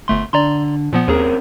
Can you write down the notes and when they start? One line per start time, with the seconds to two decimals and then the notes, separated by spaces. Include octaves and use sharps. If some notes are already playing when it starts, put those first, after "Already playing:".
0.08 G1 A3 C6
0.33 D3 D5 A#5 C6
0.93 A#2 F3 B3
1.08 D#2 C4 C#4 G#4 A#4